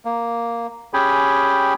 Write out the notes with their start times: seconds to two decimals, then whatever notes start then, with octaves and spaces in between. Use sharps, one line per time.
0.05 A#3
0.94 C#4 G4 G#4 G5 G#5 B5